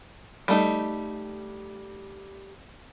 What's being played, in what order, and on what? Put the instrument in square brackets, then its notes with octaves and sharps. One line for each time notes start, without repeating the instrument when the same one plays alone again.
[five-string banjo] G3 A3 D#4